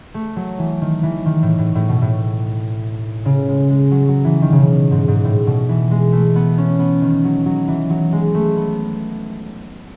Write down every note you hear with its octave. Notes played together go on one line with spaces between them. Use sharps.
A3
F#3
E3
D#3
E3
D#3
A2
A2
A2
B2
A2
C#3
G#3
G#3
F#3
F#3
E3
D#3
C#3
B2
G#2
G#2
A2
B2
E3
G#3
A3
B3
C#4
B3
D#3
F#3
F#3
E3
F#3
G#3
A3
B3